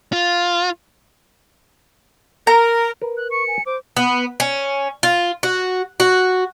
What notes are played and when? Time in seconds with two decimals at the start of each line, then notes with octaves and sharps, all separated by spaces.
0.13 F4
2.47 A#4 A#5
3.01 A#4 B4
3.17 F#6
3.31 C#6 C#7
3.48 G#5
3.66 C5 D6
3.96 B3
4.40 C#4
5.03 F4
5.43 F#4
6.00 F#4